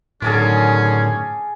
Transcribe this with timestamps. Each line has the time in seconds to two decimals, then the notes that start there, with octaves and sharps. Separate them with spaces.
0.22 A2 D3 D#3 F#3 C#4 G#4 A5 D6